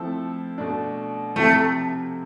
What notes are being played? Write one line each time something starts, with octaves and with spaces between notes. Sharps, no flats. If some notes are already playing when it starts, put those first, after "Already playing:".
Already playing: F3 A3 C4 E4 A4
B2 A3 D4
C3 F3 A3 C4 E4